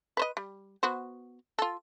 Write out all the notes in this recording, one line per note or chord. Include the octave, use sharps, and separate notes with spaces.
B4 C5 D#5
G3
B3 F#4 C5
F4 A4